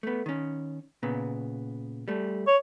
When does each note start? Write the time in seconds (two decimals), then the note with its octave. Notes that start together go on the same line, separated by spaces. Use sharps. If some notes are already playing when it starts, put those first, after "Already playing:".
0.03 A3 B3
0.26 D#3 C#4
1.03 A#2 C#3 B3
2.08 G3 A3
2.47 C#5